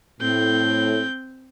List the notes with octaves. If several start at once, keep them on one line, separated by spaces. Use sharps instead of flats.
A2 C4 G6